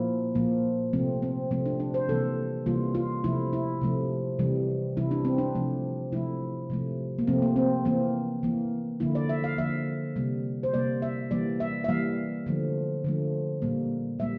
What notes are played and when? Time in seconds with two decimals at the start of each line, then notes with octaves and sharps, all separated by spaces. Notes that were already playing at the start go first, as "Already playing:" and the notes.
Already playing: A#2 F3 A#3 E4
0.35 A#2 F3 A#3
0.93 C3 F3 A3 C4
1.22 C4
1.51 C3 F3 A3 C4
1.66 D4
1.80 D4
1.94 C5
2.09 C3 E3 G3 A#3 A4
2.66 C3 E3 G3 A#3 F4
2.95 F4
3.24 C3 F3 A3 E4
3.53 E4
3.81 C3 F3 A3
4.39 C3 E3 G3
4.97 C3 E3 G3 E4
5.11 D4
5.25 C4
5.38 D4
5.55 C3 F3 A3
6.12 C3 F3 A3 E4
6.70 C3 F3 A3
7.19 A#3
7.27 C3 F3 A3 C4
7.42 A#3
7.56 C4
7.85 E3 A#3 C4
8.43 E3 A#3
9.00 D3 F3 A#3 E4
9.15 D5
9.29 E5
9.44 F5
9.58 D3 F3 A#3 E5
10.16 C3 G3 A#3
10.63 C5
10.74 C3 G3 A#3 D5
11.02 E5
11.31 E3 G3 A#3 D5
11.60 E5
11.84 E5
11.89 E3 G3 A#3 F5
12.46 D3 F3 A3
13.04 D3 F3 A3
13.62 A#2 G3 A#3
14.19 A#2 G3 A#3 E5